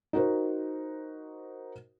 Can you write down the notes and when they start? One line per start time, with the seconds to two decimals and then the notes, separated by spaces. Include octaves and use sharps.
0.13 D#4 F#4 A#4 C5